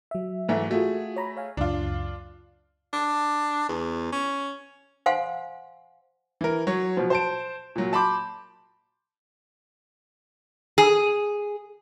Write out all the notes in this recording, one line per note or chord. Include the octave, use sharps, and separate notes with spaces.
F#3 E5
G#2 E3 A3
A3 F4 F#4 G#4
C#5 A#5 B5
C#5 F5 G#5
C#2 F#2 D4 F4
D4
E2
C#4
C5 F5 F#5 G#5 C6
E3 A#4
F#3 C#5
B2 F3
C5 A5 D7
A#2 F#3
A5 B5 C6 D6 G6
G#4